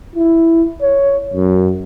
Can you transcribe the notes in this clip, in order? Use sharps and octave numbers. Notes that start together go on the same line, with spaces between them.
E4
C#5
F#2